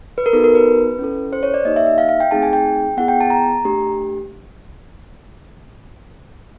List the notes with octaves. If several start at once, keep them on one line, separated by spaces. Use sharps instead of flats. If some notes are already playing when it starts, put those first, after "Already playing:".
B4
A#4
B3 D#4 F#4 A4
A#4
B4
C#4 E4 A4
C5
C#5
D5
A#3 D#4 G4 D#5
E5
E5
F5
F5
G5
A3 C4 D#4 G#4 A5
G#5
G5
B3 E4 G#4 F#5
G5
A5
A#5
A3 D4 G4